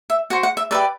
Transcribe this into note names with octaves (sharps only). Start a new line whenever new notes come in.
E5
F#4 C5 F#5
F#5
E5
G4 B4 D5 E5